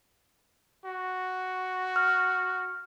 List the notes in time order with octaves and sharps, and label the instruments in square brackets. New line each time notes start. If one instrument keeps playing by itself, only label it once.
[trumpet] F#4
[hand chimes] F6